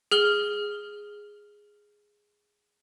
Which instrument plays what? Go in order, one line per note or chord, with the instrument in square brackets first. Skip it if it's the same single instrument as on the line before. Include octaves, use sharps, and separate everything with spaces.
[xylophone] G#4 F6 G7